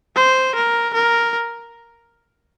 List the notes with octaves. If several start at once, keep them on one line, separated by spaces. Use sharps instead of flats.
C5
A#4
A#4